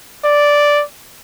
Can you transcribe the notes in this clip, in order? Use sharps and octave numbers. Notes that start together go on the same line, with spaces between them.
D5